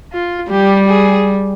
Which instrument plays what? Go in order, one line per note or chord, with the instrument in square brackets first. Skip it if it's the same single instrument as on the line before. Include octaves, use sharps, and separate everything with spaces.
[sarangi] F4
[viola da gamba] G3 [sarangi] G4
[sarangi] G#4